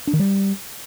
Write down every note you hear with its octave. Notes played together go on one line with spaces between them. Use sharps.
D4
D#3
G3